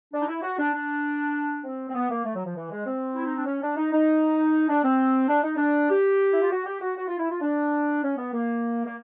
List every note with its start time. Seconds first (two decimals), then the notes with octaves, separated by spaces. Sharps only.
0.13 D4
0.21 D#4
0.28 E4
0.42 F#4
0.58 D4
0.74 D4
1.64 C4
1.89 C4
1.95 B3
2.10 A#3
2.24 A3
2.35 F#3
2.45 F3
2.56 E3
2.71 G#3
2.86 C4
3.15 E4
3.25 D#4
3.36 D4
3.46 C#4
3.62 D4
3.77 D#4
3.92 D#4
4.69 D4
4.83 C4
5.28 D4
5.43 D#4
5.56 D4
5.90 G4
6.32 E4
6.42 F4
6.51 F#4
6.66 G4
6.81 F#4
6.96 F#4
7.07 F4
7.19 E4
7.31 F4
7.41 D4
8.03 C#4
8.17 B3
8.33 A#3
8.86 A#3